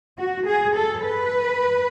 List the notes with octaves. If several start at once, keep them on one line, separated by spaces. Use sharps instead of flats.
F#4
G#4
A4
B4